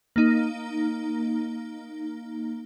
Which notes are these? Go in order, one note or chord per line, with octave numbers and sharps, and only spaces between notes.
A#3 D#4